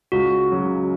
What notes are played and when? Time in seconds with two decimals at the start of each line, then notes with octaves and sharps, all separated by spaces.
0.12 C#2 F#4
0.52 C#3 F#3